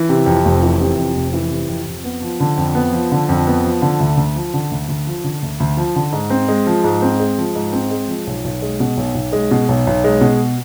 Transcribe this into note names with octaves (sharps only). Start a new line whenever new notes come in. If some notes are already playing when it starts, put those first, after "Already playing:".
Already playing: E3
C3
F2
F1
E3
C3
F2
F1
E3
C3
F2
F2
B3
F3
D3
F2
B3
F3
D3
F2
B3
F3
D3
D2
D2
F3
D3
D2
D2
F3
D3
D2
D2
F3
D3
G#2
C4
G#3
F3
G#2
C4
G#3
F3
G#2
C4
G#3
F3
B1
B1
G#3
B2
B1
B1
G#3
B2
B1
B1
G#3
B2